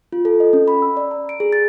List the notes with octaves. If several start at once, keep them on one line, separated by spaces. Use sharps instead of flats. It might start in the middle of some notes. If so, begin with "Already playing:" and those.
F4
A4
D#5
C#4
B5
E6
D5
A#5
D7
G#4
A6